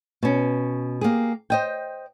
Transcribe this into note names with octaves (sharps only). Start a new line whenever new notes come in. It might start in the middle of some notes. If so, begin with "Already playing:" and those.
B2 C#4
A#3 G4 G#4
C5 D#5 G5